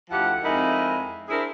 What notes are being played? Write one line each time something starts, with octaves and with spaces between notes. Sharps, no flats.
D2 F3 E4 G4 F#5
F2 G#3 D#4 E4 A#4
D4 E4 G#4 A#4 C5 E5